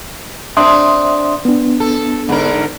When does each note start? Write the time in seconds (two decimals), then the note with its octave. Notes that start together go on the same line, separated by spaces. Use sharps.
0.57 C4 D4 E5 C6 D#6
1.45 B3 D4
1.80 A4
2.29 G#2 D3 A#4